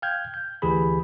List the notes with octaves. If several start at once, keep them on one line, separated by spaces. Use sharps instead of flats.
F5 G5 F6 G6 G#6
G6
D2 E3 G4 G#4 B5